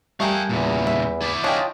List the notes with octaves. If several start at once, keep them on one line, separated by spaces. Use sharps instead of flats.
G3 A3 G#4 A#4 F5 G5
E2 A#2 C#3 E3
E5
E4 D5
D4 F4 G#4 C#5 D#5 G5 A5